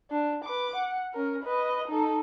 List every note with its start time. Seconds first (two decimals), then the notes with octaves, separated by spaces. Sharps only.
0.11 D4
0.44 B4 D6
0.76 F#5
1.14 C#4 A#4
1.43 B4 D#5
1.88 D#4 A4